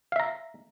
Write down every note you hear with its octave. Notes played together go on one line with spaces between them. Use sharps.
E5 F5 A#5